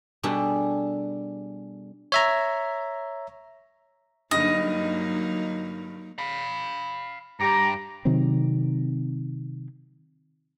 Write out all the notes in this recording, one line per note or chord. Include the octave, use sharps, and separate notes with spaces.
B2 G3 D4 G#4 A4 B4
C#5 E5 A#5
G2 D3 F#3 A#3 D#4 D#5
F5 B5
G2 G4 A#5 D6
C3 D#3 F#3 C4